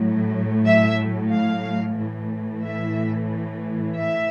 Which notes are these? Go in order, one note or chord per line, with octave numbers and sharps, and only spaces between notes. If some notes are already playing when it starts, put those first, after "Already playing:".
Already playing: A2 F#3
E5
F5
A2 E3
E5
E5